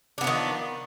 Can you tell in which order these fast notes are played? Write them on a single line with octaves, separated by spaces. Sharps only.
D4 B3 F3 D#3